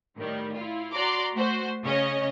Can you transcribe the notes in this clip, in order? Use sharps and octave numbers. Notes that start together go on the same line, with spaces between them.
A2 D#3 G3
E4 F4
F#4 D5 A#5 C6 D6
A3 F#4 C5
C#3 C#4 C#5 D#5